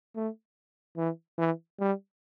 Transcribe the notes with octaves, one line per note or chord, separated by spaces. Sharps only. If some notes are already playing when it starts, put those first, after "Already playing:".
A3
E3
E3
G3